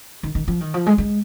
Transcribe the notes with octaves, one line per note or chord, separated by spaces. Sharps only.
D#3
D#3
F3
D#3
F3
G#3
G#3